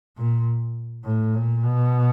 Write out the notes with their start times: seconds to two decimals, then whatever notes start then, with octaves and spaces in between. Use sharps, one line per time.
0.17 A#2
1.05 A2
1.34 A#2
1.63 B2